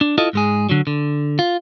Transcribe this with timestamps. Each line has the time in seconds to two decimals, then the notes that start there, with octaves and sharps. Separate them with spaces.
0.01 D4
0.18 E4 F4 A4 D#5
0.33 G#2 G#3 G#4
0.69 D3 F#3
0.87 D3
1.39 F4